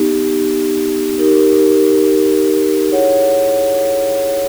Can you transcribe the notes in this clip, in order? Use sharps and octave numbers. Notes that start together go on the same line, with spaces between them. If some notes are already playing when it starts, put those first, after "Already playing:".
Already playing: B3 D#4 G4
D#4 G4 A#4
E4 G#4 C#5 F#5